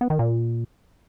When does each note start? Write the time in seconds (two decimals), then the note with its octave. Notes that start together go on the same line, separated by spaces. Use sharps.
0.01 B3
0.10 D#3
0.19 A#2